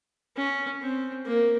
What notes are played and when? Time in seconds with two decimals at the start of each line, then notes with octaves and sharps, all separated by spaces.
0.37 C#4
0.82 C4
1.25 A#3